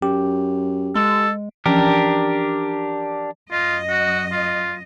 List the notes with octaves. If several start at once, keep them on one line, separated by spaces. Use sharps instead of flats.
F#2 G4
G#3 A4
E3 F3 C#4 D4 G4 A#4
F#2 F4 D#5
F#4
F4